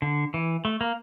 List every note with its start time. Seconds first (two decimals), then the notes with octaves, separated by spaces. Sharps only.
0.02 D3
0.34 E3
0.65 A3
0.81 A#3